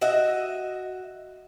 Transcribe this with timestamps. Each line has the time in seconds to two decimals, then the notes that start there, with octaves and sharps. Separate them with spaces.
0.01 F#4 D#5 E5